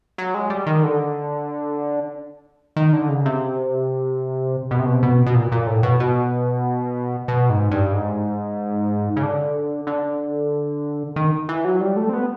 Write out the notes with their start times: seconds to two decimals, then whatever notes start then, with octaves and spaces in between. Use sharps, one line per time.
0.18 F#3
0.34 G#3
0.50 G3
0.67 D#3
0.83 D3
2.76 D#3
2.93 D3
3.09 C#3
3.26 C3
4.71 B2
4.79 C3
4.86 B2
4.95 C3
5.03 B2
5.26 B2
5.35 A#2
5.52 A#2
5.67 A2
5.83 B2
6.00 B2
7.28 B2
7.50 G#2
7.71 G2
7.93 G#2
9.16 C#3
9.23 D3
9.87 D3
11.16 D#3
11.49 E3
11.65 F#3
11.81 G3
11.96 A3
12.09 C4
12.13 B3